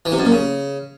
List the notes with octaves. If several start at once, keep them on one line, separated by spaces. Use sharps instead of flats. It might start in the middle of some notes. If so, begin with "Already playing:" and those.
E3
C3
F#2
A#2
C#3